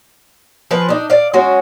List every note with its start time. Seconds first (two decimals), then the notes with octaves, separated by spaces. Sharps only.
0.71 F3 G#4 B4
0.89 D4 D#4
1.10 D5 F5
1.34 G#3 C#4 F#4